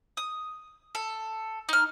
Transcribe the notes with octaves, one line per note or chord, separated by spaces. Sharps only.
D#6
A4
D#4 F6